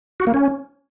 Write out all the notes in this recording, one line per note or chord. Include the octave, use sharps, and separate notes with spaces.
F#4
A#3
C#4